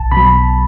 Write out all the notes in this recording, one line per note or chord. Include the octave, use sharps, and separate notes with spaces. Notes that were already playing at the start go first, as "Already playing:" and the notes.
Already playing: B1 A5
B2 B5
F#3